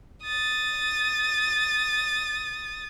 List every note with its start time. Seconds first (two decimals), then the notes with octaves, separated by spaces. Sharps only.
0.23 D#6 A6